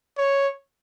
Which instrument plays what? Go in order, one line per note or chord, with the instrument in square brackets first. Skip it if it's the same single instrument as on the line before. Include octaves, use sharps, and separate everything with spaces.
[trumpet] C#5